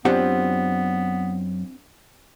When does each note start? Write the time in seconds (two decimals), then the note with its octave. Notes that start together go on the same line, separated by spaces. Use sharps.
0.05 F#2 B3 C4 D4 F4 G4 F#5